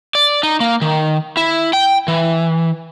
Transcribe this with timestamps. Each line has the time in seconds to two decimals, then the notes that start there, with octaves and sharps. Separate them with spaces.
0.15 D5
0.43 D#4
0.60 A#3
0.82 D#3
1.37 E4
1.73 G5
2.08 E3